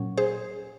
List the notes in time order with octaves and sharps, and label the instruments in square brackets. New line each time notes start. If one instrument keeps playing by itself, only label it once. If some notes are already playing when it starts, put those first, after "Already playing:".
Already playing: [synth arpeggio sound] A#2 F#3 C#4
G#4 C5